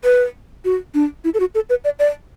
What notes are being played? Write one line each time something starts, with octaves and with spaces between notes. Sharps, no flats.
B4
F#4
D4
E4
A4
F#4
A4
B4
D5
D5